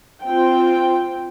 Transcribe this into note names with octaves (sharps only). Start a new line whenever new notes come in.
C4 F4 G5